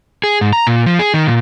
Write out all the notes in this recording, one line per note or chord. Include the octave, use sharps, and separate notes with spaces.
G#4
G#2
A#5
A#2
F3
G#4
D#3
A#2